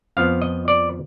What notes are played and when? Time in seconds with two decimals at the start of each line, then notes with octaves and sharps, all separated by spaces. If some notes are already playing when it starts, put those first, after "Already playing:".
0.17 F2 F3 B3 F5
0.42 D#5
0.68 D5